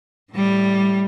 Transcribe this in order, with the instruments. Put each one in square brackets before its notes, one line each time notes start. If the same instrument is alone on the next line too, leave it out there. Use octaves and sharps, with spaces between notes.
[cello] A2 G3